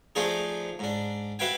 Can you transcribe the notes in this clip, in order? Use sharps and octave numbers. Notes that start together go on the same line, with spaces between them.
F3 A3 D4 D#4 F4 G#4
G#2 D4
F#4 B4 E5 F5 G5 G#5